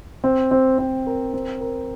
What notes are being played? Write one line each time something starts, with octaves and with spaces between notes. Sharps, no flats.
C4
C4
C4
A#4
C4
A#4